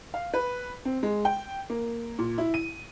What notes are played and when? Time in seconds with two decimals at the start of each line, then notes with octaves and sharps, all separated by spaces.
0.14 F5
0.34 B4
0.85 C4
1.03 G#3
1.25 G5
1.70 A#3
2.19 A#2
2.38 E4
2.54 D#7